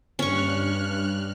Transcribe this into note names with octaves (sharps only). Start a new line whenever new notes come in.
G2 C#4 C#6 F6 F#6